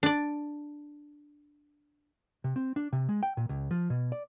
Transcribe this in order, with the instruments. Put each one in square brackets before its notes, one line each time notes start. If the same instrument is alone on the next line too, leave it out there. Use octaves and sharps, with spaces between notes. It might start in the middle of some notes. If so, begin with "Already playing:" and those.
[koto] D4 D5
[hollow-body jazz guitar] C3
C4
D4
C3
G#3
G5
A#2
C#2
F3
B2
D5